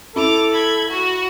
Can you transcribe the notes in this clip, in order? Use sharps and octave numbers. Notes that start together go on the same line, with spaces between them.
E4 A4 D6 F7
B5 G#6
F#4